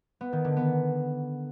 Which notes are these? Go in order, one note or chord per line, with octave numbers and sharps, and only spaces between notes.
B3
D#3
D3
B3